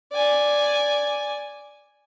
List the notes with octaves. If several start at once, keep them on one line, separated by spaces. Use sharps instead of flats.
D5 G#5